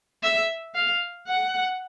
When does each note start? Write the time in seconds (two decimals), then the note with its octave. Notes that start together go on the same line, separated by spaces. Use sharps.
0.23 E5
0.75 F5
1.27 F#5